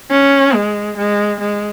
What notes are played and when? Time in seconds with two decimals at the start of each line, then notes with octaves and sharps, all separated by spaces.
0.11 C#4
0.54 G#3
0.97 G#3
1.41 G#3